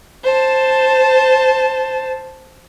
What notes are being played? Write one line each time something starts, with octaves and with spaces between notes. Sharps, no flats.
C5 A5